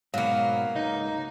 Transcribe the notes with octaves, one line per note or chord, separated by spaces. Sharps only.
G#2 B2 F#3 A#3 B3 F5 F#5
C#2 D#4